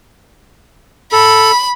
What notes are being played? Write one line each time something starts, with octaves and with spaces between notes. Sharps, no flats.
A4 B5